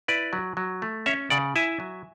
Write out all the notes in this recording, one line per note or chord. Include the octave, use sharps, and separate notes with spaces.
E4 B4 D5
F#3
F#3
A3
C#4 C#5 E5
C#3 D5 F#5
E4 E5 G#5
F#3